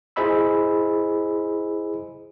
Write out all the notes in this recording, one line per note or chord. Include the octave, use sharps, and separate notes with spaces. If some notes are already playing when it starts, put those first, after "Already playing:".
E4 G#4 C5 D#5 B5 E6